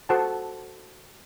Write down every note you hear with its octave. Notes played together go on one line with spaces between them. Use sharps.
F#4 A4 C5 F#5 A5